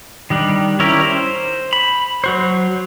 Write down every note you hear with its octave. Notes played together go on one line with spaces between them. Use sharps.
D#3 G3 D4
C#4 E4 G4 A#4
C5
B5
F#3 F#4 C5